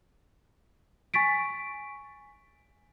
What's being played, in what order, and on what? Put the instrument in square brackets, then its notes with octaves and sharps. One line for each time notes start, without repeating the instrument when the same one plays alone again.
[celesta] G#5 C#6 A6 B6 D7